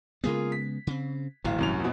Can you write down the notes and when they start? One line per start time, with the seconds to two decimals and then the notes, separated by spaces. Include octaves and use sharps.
0.24 C#3 G#3 A#3 B3 F4 G#4
0.52 B6
0.87 C#3 C4
1.44 D1 G#1 A#2 E3 F5
1.58 C2 F#2 F7
1.80 A#1 B2